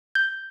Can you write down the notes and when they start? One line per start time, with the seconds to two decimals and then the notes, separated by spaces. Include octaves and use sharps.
0.15 G6